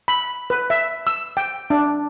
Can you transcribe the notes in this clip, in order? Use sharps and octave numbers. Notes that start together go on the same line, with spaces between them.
B5
B4
E5
E6
G5
D4